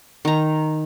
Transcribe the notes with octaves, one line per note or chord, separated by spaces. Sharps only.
D#3 A#5